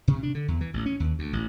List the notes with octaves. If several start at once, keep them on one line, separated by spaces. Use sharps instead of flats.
C3
D4
D3
E2
E3
A1
C#4
D#2
D2
A1